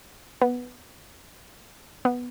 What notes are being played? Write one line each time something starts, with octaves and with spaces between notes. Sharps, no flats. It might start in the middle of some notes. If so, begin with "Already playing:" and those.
B3
B3